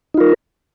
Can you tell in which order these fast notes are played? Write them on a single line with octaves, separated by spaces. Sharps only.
D#4 F4 A#4